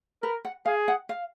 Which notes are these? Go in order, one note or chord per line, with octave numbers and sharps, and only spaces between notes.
A#4 B4
F#5
G#4 F5
F#5
F5